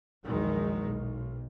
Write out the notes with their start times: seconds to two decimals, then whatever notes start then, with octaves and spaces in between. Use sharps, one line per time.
0.24 A#1 E2 A#2 D#3 F#3 G#3
0.85 B1